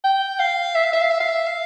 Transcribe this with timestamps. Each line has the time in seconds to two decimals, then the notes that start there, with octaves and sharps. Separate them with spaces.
0.04 G5
0.40 F5
0.75 E5
0.84 F5
0.93 E5
1.02 F5
1.11 E5
1.20 F5
1.28 E5
1.47 F5